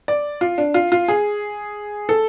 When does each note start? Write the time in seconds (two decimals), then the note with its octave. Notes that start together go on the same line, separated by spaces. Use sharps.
0.08 D5
0.41 F4
0.58 D4
0.74 F4
0.92 F4
1.08 G#4
2.09 A4